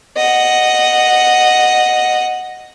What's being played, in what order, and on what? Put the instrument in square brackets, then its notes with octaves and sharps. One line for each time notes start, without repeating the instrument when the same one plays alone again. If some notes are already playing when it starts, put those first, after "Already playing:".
[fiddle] D#5 F#5